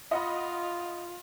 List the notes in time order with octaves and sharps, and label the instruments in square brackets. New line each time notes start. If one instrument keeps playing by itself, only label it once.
[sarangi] F4 [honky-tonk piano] D#5 F#5 B5